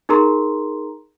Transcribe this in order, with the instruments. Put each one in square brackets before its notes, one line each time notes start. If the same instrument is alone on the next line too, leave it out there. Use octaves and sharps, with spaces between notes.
[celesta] D#4 G#4 A#4 A#5 C6